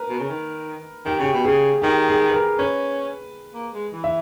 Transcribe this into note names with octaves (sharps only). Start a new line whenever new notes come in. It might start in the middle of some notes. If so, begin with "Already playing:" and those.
Already playing: A#4 B4
B2
C#3
D#3
D#3 G4
C#3 G4
B2
C#3 G#4
D#3 G4
G#4
B4
A#4
C#4 B4
A#3
G#3
E3
E5